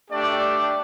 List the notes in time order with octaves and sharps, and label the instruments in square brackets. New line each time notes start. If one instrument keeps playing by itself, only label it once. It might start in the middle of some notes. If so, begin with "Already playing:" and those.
[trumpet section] A3 D4 G4 D5